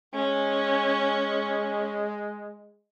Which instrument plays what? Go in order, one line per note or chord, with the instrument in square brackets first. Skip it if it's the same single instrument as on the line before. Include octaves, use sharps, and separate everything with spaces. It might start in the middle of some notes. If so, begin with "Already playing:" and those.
[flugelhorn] G#3 [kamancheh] C#4